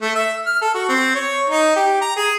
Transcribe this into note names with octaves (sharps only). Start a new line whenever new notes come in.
A3
E5
F6
A4
F#4
C4
C#5
D#4
G4
A#5
G#4